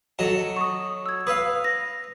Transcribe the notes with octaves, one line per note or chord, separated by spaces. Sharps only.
F#3 A4 D#5
C#6 D#6
E6 G#6
B4 F5 D#6 E6
A#6